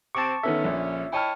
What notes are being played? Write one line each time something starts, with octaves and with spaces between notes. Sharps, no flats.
C3 C4 A5 C#6 D6
D3 D#3 B3 C#4 A4 E5
A#1
E4 C#5 D#5 G5 A5 F6